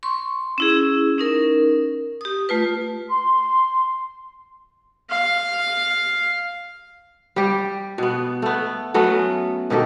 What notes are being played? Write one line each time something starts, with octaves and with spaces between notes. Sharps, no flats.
C6 C#6
C#4 E4 G#4
C#4 D#4 A#4
G4 D#6
A3 F4 B4
C6
F5
G3 G4
B2 B3
A3 B3
F#3 A3 B3 C#4
B2 D#3 G4 A4